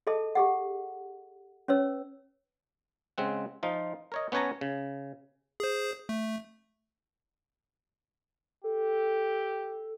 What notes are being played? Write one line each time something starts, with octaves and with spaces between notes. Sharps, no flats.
G#4 A4 D#5 A5
G4 G#4 F#5
C#4 B4 C#5 E6
C#3 G#3 C4 F#5
F3 D#4 F4
A#4 C#5 D#5
B3 C#4 B4 C#5 A5 A#5
C#3
G#4 C5
A3
G4 A4